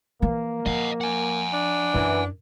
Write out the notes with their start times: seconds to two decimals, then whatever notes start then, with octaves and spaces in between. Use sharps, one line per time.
0.22 E3 F3 A#3
0.66 F3 D#5 F#5
1.01 F#5 G#5
1.53 D4
1.94 F#2 E3